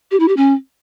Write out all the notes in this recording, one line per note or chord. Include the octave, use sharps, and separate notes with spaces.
G4
E4
G4
C#4